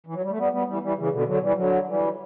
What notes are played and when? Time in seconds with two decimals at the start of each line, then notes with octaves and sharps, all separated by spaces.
0.07 E3
0.14 F#3
0.23 G3
0.30 A3
0.38 G3 B3
0.52 G3 B3
0.67 E3 G3
0.83 E3 G3
0.98 C#3 E3
1.13 B2 D3
1.27 D3 F#3
1.42 E3 G3
1.57 D3 F#3
1.88 E3 G3